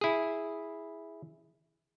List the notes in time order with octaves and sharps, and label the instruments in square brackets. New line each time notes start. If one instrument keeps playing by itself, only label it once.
[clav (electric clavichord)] E4 G#4